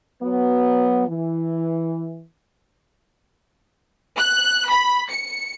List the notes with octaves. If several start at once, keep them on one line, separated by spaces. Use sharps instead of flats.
F#3 B3
E3
F#6
B5
C#7